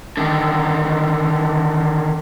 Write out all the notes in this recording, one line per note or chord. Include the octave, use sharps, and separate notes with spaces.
D3 D#3